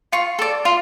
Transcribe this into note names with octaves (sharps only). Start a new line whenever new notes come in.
F4 C#6
A4 D5
F4